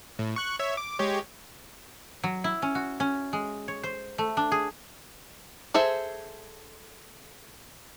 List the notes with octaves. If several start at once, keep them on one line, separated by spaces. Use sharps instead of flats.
A2
C#6 F#6
C#5 E5
D6
G#3 G4 C#5
F#3
E4
C#4
F#4
C#4
G#3
C#5
C5
A3
D4
G#4
G#4 A4 C5 E5